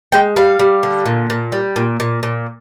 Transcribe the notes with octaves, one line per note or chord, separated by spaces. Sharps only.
G#3 G5
G3 F5
G3
D3
A#2
A#2
G3
A#2
A#2
A#2